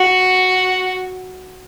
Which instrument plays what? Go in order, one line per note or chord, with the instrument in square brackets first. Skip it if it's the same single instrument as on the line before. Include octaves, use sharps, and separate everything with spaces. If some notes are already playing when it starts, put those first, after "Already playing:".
Already playing: [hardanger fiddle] F#4